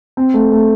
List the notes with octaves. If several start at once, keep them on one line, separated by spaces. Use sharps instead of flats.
C4
A3
A3